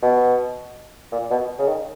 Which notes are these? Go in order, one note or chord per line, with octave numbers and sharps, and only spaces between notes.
B2
A#2
B2
C#3
D#3